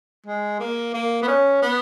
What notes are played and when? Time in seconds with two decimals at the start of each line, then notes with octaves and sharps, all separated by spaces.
0.26 G#3
0.60 A#3
0.93 A#3
1.22 B3
1.28 C#4
1.62 B3